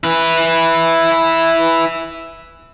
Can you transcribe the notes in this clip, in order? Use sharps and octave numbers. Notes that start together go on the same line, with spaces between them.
E4 B4